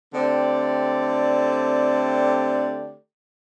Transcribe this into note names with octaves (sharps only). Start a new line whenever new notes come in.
D3 A3 C4 G4 D5